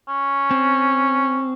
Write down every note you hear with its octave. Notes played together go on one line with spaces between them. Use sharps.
C#4
C4